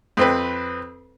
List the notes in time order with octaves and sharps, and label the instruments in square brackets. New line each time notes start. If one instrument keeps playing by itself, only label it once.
[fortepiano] F2 C4 B4